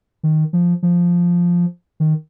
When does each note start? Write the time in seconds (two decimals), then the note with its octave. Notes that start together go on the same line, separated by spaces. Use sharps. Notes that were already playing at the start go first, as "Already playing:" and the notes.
0.23 D#3
0.53 F3
0.83 F3
2.00 D#3